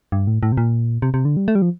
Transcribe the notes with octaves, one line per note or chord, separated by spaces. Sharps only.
G2
A2
A2
C3
A#2
C3
C3
D3
G3
A3
G3
F3